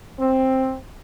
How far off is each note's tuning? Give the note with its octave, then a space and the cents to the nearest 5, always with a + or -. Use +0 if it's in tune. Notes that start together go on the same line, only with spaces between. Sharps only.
C4 +5